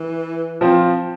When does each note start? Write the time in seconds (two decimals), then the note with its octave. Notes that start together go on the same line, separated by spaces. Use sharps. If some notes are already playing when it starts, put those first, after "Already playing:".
Already playing: E3
0.61 F3 C4 F4